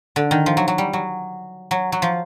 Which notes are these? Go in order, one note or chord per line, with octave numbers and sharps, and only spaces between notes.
D3
D#3
F3
F#3
F#3
G3
F#3
F#3
F#3
F3